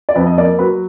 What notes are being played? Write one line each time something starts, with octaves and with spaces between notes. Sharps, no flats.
D5
F2 B4
D#5
A#3 D5
F#3 B4